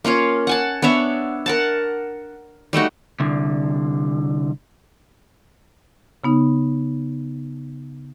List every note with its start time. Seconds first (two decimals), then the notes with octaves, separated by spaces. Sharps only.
0.05 A#3 C#4 F4 C#5
0.47 F#5 G#5 A5
0.82 B3 D4 C#5 E5
1.46 A#4 F#5 A5
2.73 G3 A3 D#4 F#4
3.20 C2 D3
6.24 C#3 B3 D#4